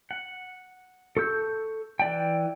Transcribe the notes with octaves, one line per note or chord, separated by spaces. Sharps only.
F#5
A4 C#6 E6 G6
E3 D5 G5